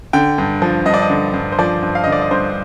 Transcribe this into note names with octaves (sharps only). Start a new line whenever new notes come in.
D3 G5
G2
F3
G2 D#5
D5
D#5
D3
G2
C5
F3 D5
G2
F5
D3 D#5
D5
D#5
G2 C5